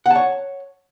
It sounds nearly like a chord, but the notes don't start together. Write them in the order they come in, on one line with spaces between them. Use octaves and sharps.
F#5 A5 C#5